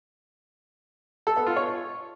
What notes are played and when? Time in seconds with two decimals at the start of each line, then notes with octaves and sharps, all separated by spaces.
1.27 A4
1.37 B3
1.47 F4
1.56 C#5